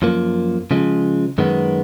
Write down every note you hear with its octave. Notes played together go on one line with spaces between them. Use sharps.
F#2 F3 A#3
C#3 F3 G#3
F#2 D#3 G#3 B3